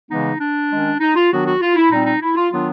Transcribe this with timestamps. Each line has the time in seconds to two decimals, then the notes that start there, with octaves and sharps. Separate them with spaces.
0.10 C#3 E3 G#3 B3 D#4
0.40 D4
0.70 D#3 G#3 C#4
1.00 D#4
1.15 F4
1.31 D#3 F#3 B3 D4 F#4
1.46 F#4
1.60 F4
1.75 E4
1.90 A#2 G3 C4 D#4
2.06 D#4
2.21 E4
2.36 F4
2.51 D#3 F#3 B3 D4 F4